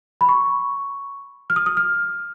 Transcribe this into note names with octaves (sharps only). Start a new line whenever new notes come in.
B5
C#6
F6
D#6
D#6
F6